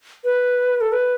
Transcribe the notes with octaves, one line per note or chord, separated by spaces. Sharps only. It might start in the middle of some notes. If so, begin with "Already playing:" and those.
B4
A4
B4